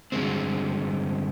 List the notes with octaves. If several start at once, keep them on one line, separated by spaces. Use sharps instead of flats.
G2 D3 G#3 C4